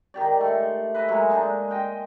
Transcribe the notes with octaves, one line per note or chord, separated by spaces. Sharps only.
D#3 G4 D5
A3 C6
B4 D#5 E5
F#3 G#3 A#3
G#3 D4 D#4
D#5 G5 C6